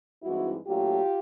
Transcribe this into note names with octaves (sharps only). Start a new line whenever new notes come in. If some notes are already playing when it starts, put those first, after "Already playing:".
G2 E3 G#3 C4 D#4 E4 F#4
A#2 F#3 A3 D4 F4 G4